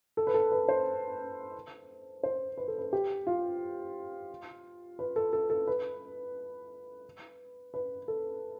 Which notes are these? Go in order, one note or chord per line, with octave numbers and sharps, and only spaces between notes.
A4
B4
A4
B4
C5
C5
B4
A4
B4
G4
F4
B4
A4
A4
A4
B4
B4
A4